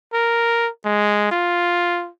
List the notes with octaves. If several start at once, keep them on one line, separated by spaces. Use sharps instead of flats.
A#4
G#3
F4